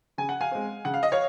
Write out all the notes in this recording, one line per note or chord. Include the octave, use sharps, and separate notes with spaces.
C#3 G#5
F#5
F5 G#5
G#3 C4
C#3 F#5
F5
D#5
C#5 F5